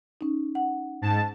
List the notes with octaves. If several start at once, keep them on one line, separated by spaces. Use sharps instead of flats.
C#4 D#4
F#5
G#2 A5